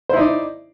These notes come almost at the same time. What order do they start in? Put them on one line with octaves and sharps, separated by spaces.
C5 E4 D#4 D5